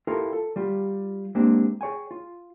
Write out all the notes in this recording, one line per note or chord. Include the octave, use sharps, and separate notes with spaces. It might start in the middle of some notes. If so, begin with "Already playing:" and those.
E4 F4 G4 A4 A#4
A4
G3 F4 G4
G#3 A#3 C4 D4 G4
G#4 C#5 G5 G#5
F4